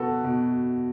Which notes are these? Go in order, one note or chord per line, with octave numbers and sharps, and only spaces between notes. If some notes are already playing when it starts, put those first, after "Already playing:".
Already playing: B2 F#4 A4 B4
B2